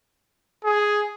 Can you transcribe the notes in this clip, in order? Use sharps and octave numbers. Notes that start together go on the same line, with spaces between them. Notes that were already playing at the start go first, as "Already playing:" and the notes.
G#4